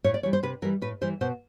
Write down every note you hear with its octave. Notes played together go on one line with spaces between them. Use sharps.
A2 C#5
D5
E3 G3 C#5
C5
C3 B4
E3 G3 A#4
A2 B4
E3 G3 C5
B2 C5